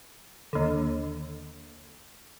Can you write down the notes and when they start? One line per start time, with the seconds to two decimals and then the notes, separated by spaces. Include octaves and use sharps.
0.53 D#2 D3